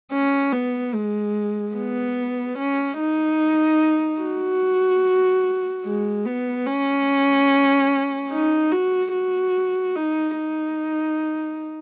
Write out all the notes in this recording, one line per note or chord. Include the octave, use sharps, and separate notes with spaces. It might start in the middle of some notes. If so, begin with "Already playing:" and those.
C#4
B3
G#3
B3
C#4
D#4
F#4
G#3
B3
C#4
D#4
F#4
F#4
D#4
D#4